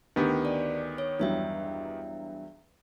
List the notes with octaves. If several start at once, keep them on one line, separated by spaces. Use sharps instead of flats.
D2 D#3 B3 G4
D5
C#5
E2 G2 F#3 D4 E5 G5